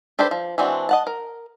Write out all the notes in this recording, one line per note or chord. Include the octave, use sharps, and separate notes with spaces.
D4 G4 A4 B4 C5
F3
E3 G#3 C4 D4 F#4
D#5 F#5 A5
A#4